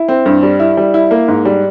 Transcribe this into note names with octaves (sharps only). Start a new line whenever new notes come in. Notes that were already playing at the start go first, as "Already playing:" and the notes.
Already playing: E4
C4
G2
G3
E4
G3
E4
A#3
G#2
G3